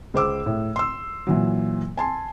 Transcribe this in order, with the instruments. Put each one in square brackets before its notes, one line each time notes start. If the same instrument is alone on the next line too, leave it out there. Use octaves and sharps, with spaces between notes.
[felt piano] C#2 C5 D6 E6
A2
C6 E6
A#2 E3 F#3
G#5 A5 C6